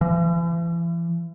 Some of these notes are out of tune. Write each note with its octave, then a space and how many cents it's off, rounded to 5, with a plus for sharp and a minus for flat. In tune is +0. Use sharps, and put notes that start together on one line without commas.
E3 +40